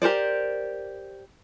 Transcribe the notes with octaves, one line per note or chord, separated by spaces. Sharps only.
G4 A#4 C5 D5